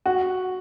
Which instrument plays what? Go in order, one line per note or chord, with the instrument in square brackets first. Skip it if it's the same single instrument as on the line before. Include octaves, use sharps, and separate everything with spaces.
[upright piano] F#4